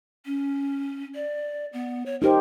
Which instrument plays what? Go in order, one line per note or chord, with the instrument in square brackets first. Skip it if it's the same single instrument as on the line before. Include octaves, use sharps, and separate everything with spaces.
[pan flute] C#4
D5
B3
C#5
[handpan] D#4 G4 C5 [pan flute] A#4